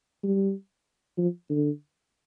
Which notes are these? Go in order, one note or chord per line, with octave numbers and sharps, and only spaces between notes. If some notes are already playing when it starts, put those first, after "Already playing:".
G3
F3
D3